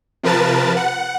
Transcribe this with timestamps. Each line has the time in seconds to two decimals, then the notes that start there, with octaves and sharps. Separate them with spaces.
0.23 C3 F3 A#4 B4 A5 A6
0.76 F#5